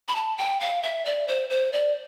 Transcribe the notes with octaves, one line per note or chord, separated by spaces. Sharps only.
B5
A5
G5
F5
E5
D5
C5
C5
D5